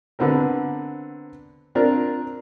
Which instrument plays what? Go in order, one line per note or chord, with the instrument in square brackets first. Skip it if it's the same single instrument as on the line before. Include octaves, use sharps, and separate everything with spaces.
[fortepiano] D3 B3 C4 A#4
C4 D4 F4 A#4